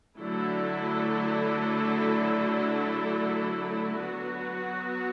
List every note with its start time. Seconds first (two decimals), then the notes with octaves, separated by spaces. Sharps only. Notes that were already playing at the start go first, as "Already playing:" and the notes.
0.18 D3 F#3 A3 E4 A4
3.96 F#3 B3 F#4